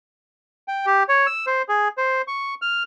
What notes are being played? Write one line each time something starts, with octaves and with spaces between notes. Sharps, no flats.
G5
G4
C#5
E6
C5
G#4
C5
C#6
F6